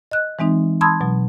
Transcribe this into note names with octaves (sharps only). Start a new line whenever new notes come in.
D#5 F#6
E3 G#3 C4 D#4
A5 B5 C6 D#6 E6 G#6
B2 F#3